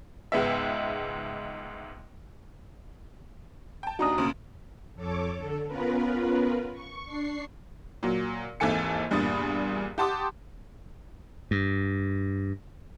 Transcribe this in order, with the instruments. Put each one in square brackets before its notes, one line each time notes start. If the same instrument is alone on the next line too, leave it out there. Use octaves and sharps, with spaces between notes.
[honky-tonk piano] C#2 G#2 G#3 B3 E5
G5 A5
[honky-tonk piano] D#2 D4 D#4 [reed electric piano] F#4 A#5 D#6
[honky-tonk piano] D2 A#2 C#3
[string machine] F2 A4 C#5 D6
D3 A4
B3 C#4 F4 A#4 B4
C#6
D4 C#6 C7
[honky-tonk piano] A#2 F#3
G#1 D#2 E3 A4 G#5 C#7
E2 G2 A#2 B5 D#6 A6
G4 F#5 A5 C6 D6 D#6
[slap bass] G2